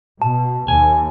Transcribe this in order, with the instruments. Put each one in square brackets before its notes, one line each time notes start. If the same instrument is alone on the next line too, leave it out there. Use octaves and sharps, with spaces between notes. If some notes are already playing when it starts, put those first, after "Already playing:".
[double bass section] B2 [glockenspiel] A5
[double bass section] D#2 [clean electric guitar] G#5